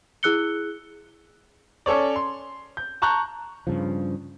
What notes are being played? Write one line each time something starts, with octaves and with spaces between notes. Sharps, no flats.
E4 G#4 E6 F#6 C#7 G7
C#4 A4 C#5 D5
C6
G6
A5 A#5 C#6 F#6 G6
G2 C#3 F3